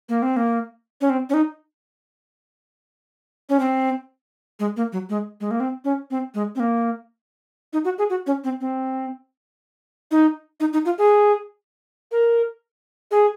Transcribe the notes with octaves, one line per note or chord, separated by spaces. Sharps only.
A#3
C4
A#3
C#4
C4
C#4
D#4
C#4
C4
G#3
A#3
F#3
G#3
G#3
A#3
C4
C#4
C4
G#3
C4
A#3
D#4
F#4
G#4
F#4
C#4
C4
C4
D#4
D#4
D#4
F4
G#4
A#4
G#4